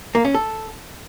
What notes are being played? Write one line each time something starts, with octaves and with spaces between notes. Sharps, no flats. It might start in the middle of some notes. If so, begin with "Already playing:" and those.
A#3
C#4
A4